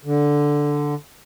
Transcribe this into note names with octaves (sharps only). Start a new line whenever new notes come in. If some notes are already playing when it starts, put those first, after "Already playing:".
D3